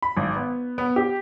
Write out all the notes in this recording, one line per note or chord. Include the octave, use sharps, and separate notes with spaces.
B5
G#1
B3
B3
G4